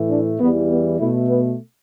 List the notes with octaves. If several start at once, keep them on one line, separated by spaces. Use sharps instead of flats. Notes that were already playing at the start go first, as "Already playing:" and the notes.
Already playing: A2 E3 A3
D4
E2 E3 G3 B3
B3
B2 A3 E4
B3